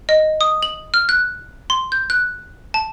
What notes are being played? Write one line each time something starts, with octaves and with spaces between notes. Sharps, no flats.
D#5
D#6
F#7
F6
F#6
C6
G6
F#6
A5